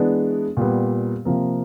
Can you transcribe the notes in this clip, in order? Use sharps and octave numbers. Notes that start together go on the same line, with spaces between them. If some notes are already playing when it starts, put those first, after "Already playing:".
Already playing: E3 G#3 B3 D4
A#2 G3 B3
C3 F3 A#3